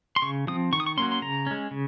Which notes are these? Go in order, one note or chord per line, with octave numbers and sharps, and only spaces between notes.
C6
C#3 C#6
F3 C4 D#6
D#3 C#6
D#6
C#6
F#3 A#3 C#4 C6
C6
C#3 A#5
G#3 C#4
C#3